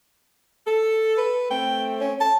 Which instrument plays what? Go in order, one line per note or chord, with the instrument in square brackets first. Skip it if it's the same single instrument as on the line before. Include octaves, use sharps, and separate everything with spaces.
[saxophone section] A4
[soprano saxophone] B4
[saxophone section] A3 C4 [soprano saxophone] G5
[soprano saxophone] C#4
A5